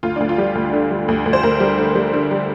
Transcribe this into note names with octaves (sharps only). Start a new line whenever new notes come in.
D2 F4
D2 D4
F4
G3
D2
D3
G3
D2
D2
C5
D2 A#4
G3
D3
G3
D3
G3